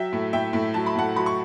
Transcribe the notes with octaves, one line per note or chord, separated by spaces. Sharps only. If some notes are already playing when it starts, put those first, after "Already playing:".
Already playing: F#3 E5 G5
A2
A2 E5 G5
A2
F#3 A5
B5
A2 F#5 A5
F#3 B5
C#6